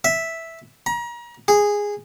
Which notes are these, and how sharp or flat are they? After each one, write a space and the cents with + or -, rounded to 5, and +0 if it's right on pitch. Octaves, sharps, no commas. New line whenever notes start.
E5 -5
A#5 +35
G#4 -10